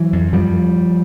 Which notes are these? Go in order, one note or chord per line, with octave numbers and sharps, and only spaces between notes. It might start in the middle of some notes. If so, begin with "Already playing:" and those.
Already playing: E3 F#3
F2
F#2 F3 G3